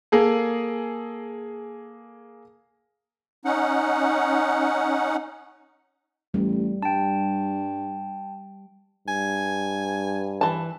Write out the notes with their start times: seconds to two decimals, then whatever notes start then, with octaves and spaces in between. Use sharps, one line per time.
0.12 A#3 G#4 A4
3.45 C#4 D#4 F#5
6.34 A1 G3
6.82 G2 G5 A5
9.08 G2 G#5
10.41 E3 A5